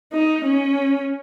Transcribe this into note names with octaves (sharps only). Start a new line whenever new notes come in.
D#4
C#4